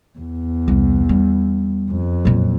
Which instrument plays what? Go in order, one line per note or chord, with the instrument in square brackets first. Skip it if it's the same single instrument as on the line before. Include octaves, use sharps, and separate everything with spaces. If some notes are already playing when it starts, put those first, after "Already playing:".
[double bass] E2
[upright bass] C2
G3
[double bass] F2
[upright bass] F#2 A#2